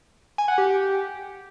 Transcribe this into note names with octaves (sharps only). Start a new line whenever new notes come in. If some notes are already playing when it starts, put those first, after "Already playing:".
G#5
F#5
G4